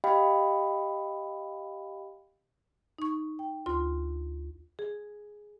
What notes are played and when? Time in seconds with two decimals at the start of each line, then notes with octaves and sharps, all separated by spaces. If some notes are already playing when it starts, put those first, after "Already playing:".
0.04 G4 D#5 F5 G5 B5
2.99 D#4 C#6
3.39 G5
3.66 D2 F4 C6
4.79 G#4